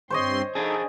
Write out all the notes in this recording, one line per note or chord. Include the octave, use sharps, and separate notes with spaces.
G2 C4 C5 C#5 D#5 C6
D4 D#4 G#4 A4